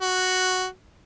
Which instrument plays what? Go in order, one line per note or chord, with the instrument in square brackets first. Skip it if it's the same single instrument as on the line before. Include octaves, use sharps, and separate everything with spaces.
[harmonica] F#4